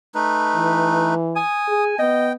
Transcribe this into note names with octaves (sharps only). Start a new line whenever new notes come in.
A3 D#4 B4
E3
G#5 D#6
G#4
B3 D#5 G5